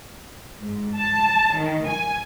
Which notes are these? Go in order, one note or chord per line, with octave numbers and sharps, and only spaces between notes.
G#2
A5
D#3
G#5